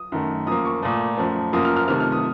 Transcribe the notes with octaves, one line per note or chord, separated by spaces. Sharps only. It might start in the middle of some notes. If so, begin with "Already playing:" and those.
Already playing: D#6
F#2 D#3 A3
F#2 F3 A#3 D#6
C#6
A#2 A3 D#6
F#2 F3 A3
F#2 F3 A#3 D#6
F6
F6
C3 D#3 A3 F6
F6
D#6